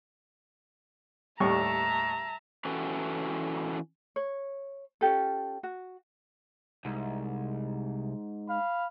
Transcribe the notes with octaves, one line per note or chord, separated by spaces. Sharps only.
D#2 A2 G3 E5 A5 A#5 C#6
E3 C#4 F#4 G4 A4 B4
C#5
C#4 F4 G4 A4
F#4
C2 G#2
F5 B5